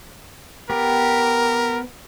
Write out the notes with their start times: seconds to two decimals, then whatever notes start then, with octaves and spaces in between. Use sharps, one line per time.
0.70 B3 G4 A#4